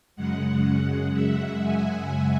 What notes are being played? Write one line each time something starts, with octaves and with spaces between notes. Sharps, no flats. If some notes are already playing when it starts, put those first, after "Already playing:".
F#2 C#3 G#3 F#5
E5
G#5